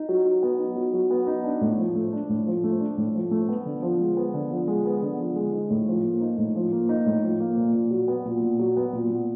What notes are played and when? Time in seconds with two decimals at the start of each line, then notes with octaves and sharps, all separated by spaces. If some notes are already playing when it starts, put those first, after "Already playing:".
Already playing: D#4
0.09 F#3
0.25 F#3
0.43 B3
0.59 D#4
0.76 F#3
0.93 F#3
1.11 B3
1.27 D#4
1.44 D4
1.61 A2
1.78 F3
1.96 A3
2.13 D4
2.29 A2
2.47 F3
2.64 A3
2.80 D4
2.97 A2
3.15 F3
3.31 A3
3.49 B3
3.65 D3
3.82 F3
4.00 G#3
4.17 B3
4.34 D3
4.51 F3
4.67 G#3
4.85 B3
5.02 D3
5.19 F3
5.36 G#3
5.53 D#4
5.70 A2
5.87 F3
6.04 A#3
6.21 D#4
6.38 A2
6.55 F3
6.72 A#3
6.89 D#4
7.06 A2
7.23 F3
7.40 A#3
7.57 A#2
7.74 A#2
7.91 F#3
8.08 B3
8.25 A#2
8.42 A#2
8.59 F#3
8.77 B3
8.93 A#2
9.10 A#2